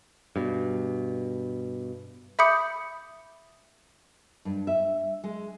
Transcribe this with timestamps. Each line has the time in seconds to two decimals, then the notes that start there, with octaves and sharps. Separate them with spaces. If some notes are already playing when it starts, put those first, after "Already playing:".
0.36 G2 B2
2.39 E5 B5 D6 D#6 G6 C#7
4.45 G2
4.67 E5
5.24 G#3